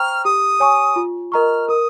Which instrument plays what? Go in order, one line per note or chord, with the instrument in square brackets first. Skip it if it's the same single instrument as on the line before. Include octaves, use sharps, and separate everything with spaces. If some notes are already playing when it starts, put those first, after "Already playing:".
Already playing: [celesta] C5 G5 A#5 C#6 [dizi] F6
[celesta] G4 [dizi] D#6
[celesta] C#5 G#5 C#6
F4
[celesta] A#4 D#5 A#5 C#6 [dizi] F6
[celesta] A#4 [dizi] D#6